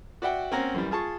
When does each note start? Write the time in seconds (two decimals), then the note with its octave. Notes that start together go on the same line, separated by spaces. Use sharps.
0.22 F#4 D5 E5 F#5 G5
0.51 A#3 C4 C#4 A#4 F#5 A#5
0.74 F#2 E3 G3
0.91 F4 G#4 A5 C#6